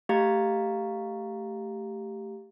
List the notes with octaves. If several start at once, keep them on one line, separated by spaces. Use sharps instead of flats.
A3 G4 F5 A#5 A6